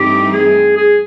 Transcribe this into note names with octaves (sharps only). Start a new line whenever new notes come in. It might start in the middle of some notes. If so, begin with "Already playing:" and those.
Already playing: G2 E3 A3 C4 D#4 G4
G#4
G#4